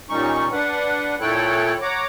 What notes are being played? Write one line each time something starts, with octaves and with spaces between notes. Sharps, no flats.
A#2 D#3 G3 C#4 D#4 C#6
D4 B4 F#5
A#2 E4 A4 C#5 G5 F#6
C#5 F#5 A#5 D6